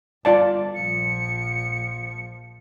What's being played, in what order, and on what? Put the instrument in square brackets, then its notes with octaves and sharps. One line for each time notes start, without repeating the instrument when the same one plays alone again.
[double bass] G1 [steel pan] F4 D5 A5
[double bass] A#1 F3 [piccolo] C#7